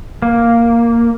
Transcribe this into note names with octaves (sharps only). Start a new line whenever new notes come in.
A#3